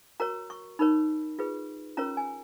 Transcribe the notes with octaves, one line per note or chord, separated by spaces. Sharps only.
F#4 A#4 C#5 A#5
C#6
D#4 A#4 C#5 B5
F4 G#4 B4
C#4 F4 A#4 C#5 A#5
G#5